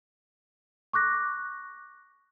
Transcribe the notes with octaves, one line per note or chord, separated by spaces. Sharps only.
C#6 D6 F#6 A#6